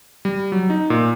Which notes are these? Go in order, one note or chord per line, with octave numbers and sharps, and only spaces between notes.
G3
F#3
D#4
A#2